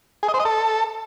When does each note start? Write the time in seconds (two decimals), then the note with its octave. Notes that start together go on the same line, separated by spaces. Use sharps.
0.23 G#4
0.28 D#5
0.34 C5
0.40 D#5
0.45 A4